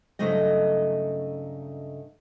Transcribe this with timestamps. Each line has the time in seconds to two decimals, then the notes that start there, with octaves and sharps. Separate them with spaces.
0.19 G2 C#3 F#3 A3 D#4 D#5